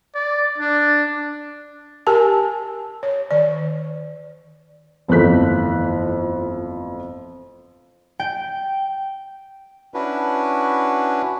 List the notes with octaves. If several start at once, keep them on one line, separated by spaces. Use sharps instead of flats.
D5
D4
G4 A#4 G#5 A5
C#5
D#3 D5
G1 F2 E3 A3 F#6 B6
G5
C#4 D4 E4 F#4 B4